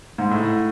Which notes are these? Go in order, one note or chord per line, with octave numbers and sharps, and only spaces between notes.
G#2
A2